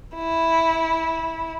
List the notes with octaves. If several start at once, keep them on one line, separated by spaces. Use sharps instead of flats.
E4